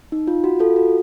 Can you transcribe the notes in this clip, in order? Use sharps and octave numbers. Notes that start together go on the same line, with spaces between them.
D#4
F4
F#4
F4 A4
F#4